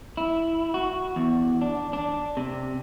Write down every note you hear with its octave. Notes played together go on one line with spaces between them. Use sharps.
E4
F#4
E2
D4
D4
C3